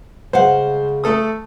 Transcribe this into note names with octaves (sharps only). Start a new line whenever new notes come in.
C#3 G#3 C5 F5 F#5
A3 A4 D#6